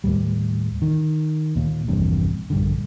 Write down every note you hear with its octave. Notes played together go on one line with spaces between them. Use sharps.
D#2 A2 G3
D#3
D#2 A#2
A#1 E2 G2 C3
A#1 G2 D3